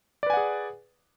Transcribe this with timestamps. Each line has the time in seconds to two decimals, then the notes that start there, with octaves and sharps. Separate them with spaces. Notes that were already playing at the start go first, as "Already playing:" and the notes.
0.23 D5
0.26 B4
0.30 G#5
0.33 F#5
0.37 G#4